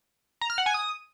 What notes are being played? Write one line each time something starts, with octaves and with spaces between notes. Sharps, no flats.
A#5
F6
F#5
G#5
D#6